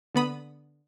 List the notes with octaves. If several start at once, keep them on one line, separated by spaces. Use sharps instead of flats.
D3 B3 B5 D#6